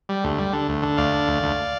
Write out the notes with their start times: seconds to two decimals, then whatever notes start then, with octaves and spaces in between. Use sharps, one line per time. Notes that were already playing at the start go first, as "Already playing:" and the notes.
0.09 G3
0.24 D2
0.38 G3
0.53 D3
0.68 D2
0.83 D3
0.97 D2 D5 F5
1.13 D3
1.28 D2
1.43 D2